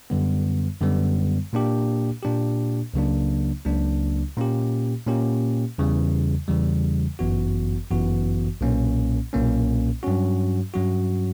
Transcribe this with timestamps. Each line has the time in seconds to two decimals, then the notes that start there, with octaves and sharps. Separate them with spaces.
0.10 F#2 D3 G3 B3
0.81 F#2 D3 G3 B3
1.53 A#2 A#3 D4 G4
2.23 A#2 A#3 D4 G4
2.94 C#2 C#3 F#3 A#3 D4
3.65 C#2 C#3 F#3 A#3 D4
4.36 A#2 A#3 C#4 G4
5.06 A#2 A#3 C#4 G4
5.78 E2 C#3 E3 G3
6.48 E2 C#3 E3 G3
7.19 G1 F#2 E3 B3 F#4
7.91 G1 F#2 E3 B3 F#4
8.61 B1 A#2 A#3 C#4
9.33 B1 A#2 A#3 C#4
10.03 G2 F#3 C#4 F#4
10.74 G2 F#3 C#4 F#4